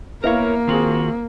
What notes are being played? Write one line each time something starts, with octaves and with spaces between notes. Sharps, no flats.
A#3 B3 E4 A#4 C#5 F5
D#3 C4 F4 F#4 G#4